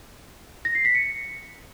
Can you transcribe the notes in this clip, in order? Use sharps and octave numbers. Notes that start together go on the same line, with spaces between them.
A#6
C7
B6
C#7